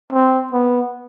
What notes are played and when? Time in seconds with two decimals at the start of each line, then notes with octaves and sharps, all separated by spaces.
0.12 C4
0.52 B3